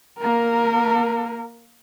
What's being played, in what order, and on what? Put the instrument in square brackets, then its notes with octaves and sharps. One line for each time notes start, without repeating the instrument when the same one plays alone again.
[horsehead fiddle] A#3 A#4